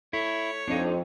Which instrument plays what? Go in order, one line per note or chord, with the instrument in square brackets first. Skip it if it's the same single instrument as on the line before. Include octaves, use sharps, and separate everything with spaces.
[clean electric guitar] E4 [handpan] A4 [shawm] C#5
[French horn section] F2 [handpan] C4 A4 [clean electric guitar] D4 D#4